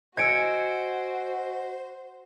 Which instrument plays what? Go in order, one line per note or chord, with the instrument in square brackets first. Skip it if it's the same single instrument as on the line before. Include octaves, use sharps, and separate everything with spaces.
[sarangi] F#4 [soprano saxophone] C5 [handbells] D#5 G#5 E6 [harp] G#6 C#7 D7